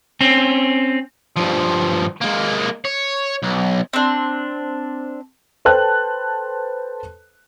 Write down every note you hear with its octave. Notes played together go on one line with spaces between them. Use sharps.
C4 C#4
G2 F3
G#3 A#3
C#5
B1
C4 D4
A4 B4 C5 G5 A5 F#6